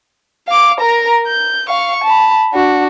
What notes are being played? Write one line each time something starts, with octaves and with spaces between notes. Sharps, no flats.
F5 D6
A#4 A#5
G6
F5 C#6
A5 B5
D4 F#4